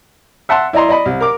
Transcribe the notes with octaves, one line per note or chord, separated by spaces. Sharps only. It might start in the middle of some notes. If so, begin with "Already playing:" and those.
E5 F#5 A5 C6
E4 D5 D#5 A#5 C6
D5 D#5 B5
C2
A#4 D6